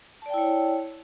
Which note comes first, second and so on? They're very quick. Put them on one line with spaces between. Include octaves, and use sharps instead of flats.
A5 D5 G5 E4 C#5